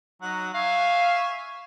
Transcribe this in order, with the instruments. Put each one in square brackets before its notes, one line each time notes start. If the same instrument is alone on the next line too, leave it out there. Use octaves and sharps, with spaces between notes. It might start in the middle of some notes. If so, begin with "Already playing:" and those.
[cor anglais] F#3 [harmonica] D#4 F#5
[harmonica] E5 G#5 C#6 [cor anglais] F5